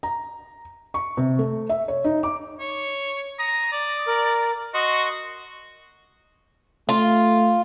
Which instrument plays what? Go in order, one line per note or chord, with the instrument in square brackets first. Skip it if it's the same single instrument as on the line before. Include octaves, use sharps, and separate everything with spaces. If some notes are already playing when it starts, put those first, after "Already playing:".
[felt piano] A#5
C#6
C3
A3
E5
C#5
D#4
D6
[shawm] C#5
[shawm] A#5 [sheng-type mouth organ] D#6
[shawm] D5
[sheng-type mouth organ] A#4
[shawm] F#4 [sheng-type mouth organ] D#5 C6 C#6
[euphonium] A3 [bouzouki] F4